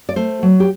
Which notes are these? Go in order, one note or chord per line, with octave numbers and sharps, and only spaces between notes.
D5
A3 C5
F#3
G4